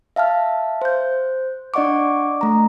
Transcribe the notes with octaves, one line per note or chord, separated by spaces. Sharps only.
E5 F5 A5 F6
C5 G6
D4 D5 D#5 F#5 C#6 D6
A3 A#5